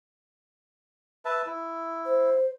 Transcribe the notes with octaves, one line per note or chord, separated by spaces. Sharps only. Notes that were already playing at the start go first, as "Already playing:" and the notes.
B4 E5 A5
E4
C5